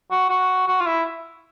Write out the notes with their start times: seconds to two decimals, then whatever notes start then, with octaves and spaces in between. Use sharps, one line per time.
0.11 F#4
0.29 F#4
0.68 F#4
0.81 F4
0.86 E4